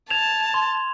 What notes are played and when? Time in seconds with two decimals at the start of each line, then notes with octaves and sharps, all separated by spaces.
0.10 A5 G#6 E7 F7
0.54 C6